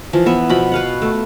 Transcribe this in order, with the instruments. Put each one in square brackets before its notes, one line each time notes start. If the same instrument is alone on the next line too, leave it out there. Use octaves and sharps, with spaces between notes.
[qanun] E3 F3
B3 E5
B2 F3 B5
B4 F5 F#5
A3